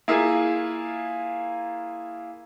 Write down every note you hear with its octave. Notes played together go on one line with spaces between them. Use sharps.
A#3 E4 F4 G#4